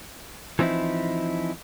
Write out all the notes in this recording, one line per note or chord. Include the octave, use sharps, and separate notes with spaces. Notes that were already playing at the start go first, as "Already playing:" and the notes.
E3 F3 C4 D#4 E4